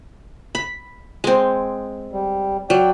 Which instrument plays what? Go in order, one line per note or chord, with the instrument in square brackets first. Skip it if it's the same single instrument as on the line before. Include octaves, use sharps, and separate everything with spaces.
[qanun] B5
G#3 C4
[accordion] G3
[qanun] F#3 [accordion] D5 G5